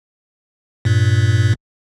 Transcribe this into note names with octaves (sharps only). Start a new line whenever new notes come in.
G2 A#2